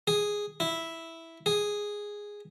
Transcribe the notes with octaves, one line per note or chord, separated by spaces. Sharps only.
G#4
E4
G#4